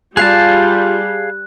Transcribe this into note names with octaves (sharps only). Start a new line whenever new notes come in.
G3 F4 G#4 F5 A5 F#6